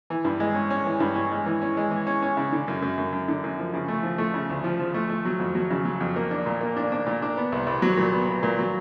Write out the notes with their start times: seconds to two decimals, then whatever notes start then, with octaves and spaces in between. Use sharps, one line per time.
0.10 E3
0.25 G2
0.40 G#3
0.55 C#4
0.70 C#4
0.86 E3
1.00 G2
1.15 C#4
1.32 G#3
1.46 E3
1.62 C#4
1.77 G#3
1.91 E3
2.07 C#4
2.22 C#4
2.37 C#3
2.52 D3
2.68 F#2
2.82 F#2
2.98 F#2
3.13 F#2
3.28 D3
3.44 F#2
3.59 F3
3.74 C#3
3.88 A3
4.03 F3
4.18 A3
4.34 C#3
4.50 D2
4.64 F3
4.79 F3
4.94 A3
5.09 A3
5.25 F#3
5.40 F2
5.55 F#3
5.70 C#3
5.85 F#3
6.01 F2
6.16 A#3
6.31 D4
6.46 A#2
6.61 A#3
6.77 D4
6.92 D4
7.07 A#2
7.22 D4
7.37 B3
7.52 C2
7.67 C2
7.82 F#3
7.97 A#2
8.13 B3
8.28 B3
8.43 A#2
8.59 F#3